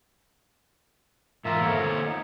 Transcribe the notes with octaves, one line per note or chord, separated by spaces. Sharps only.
G#2 E3 F4 A#4 E5 A#5
A#3 A4 C5 C#5
D#4